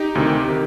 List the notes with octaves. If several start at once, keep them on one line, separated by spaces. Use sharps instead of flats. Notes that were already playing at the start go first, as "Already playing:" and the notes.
Already playing: D#4 G4
D2 C3 D#3
C3 D#3